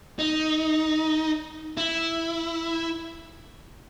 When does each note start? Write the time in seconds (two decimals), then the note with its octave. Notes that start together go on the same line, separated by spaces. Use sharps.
0.19 D#4
1.77 E4